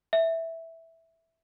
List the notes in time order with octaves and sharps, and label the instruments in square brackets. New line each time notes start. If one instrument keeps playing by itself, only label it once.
[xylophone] E5